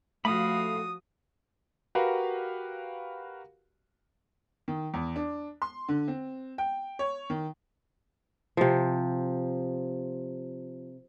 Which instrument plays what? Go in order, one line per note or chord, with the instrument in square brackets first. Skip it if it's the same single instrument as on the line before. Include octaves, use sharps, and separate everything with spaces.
[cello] F3 F#4 [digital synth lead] A3 [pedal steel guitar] F5 B5 [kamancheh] D#6
[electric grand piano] F#4 G4 A#4 B4 F5
[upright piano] D#3
E2
D4
C6
D3
C4
G5
C#5
D#3
[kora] C3 F3